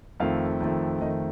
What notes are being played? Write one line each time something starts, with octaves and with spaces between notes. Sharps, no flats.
F2 D#3 A3 F5
F2 D#3 A3
F2 D#3 A3 D#5